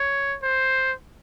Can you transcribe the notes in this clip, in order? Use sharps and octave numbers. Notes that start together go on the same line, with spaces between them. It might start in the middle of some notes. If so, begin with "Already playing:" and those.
Already playing: C#5
C5